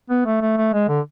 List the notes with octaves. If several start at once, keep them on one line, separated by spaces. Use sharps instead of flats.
B3
A3
A3
A3
G#3
D3